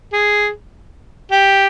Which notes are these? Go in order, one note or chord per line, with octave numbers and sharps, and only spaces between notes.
G#4
G4